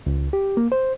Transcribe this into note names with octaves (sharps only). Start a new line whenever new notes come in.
C#2
G4
A#3
C5